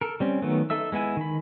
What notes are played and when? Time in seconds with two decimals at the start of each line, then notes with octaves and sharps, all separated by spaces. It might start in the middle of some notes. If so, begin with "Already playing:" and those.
0.01 A4 A#4
0.20 G3 C4 C#4
0.42 D#3 F#3 A3 B3
0.70 D#4 A4 E5 E6
0.92 G#3 B3 E4 G#5
1.17 D#3 B5